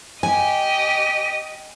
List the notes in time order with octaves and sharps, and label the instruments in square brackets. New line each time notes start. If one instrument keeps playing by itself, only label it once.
[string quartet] G4 D#5 [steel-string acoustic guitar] G#5